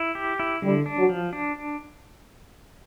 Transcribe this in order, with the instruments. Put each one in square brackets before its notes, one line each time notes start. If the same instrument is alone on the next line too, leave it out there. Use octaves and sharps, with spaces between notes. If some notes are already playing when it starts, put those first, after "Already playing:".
Already playing: [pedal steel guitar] E4
G4
E4
[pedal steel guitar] D3 [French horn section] G3
[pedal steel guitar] D4
[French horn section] F#3
[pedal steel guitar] F3
D4